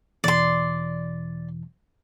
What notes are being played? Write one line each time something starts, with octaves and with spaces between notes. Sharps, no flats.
E2 B2 E3 D5 C6